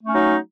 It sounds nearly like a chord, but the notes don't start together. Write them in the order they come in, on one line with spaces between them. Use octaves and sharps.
A3 C#4 D#4 F#3